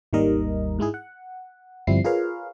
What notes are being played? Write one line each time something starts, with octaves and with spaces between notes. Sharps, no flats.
G#1 D#2 D#3 G3 A#4 D#5
G#2 G#3 E4 G#4
F#5
G1 F3 G3 C4 E4 C7
F4 G#4 A#4 B4 C#5 F5